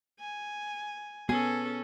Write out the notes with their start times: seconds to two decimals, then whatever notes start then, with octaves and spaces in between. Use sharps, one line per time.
0.20 G#5
1.29 B3 C#4 G#4 A4